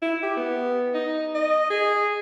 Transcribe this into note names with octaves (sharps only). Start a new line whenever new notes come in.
E4
G4
B3
D#4
D#5
G#4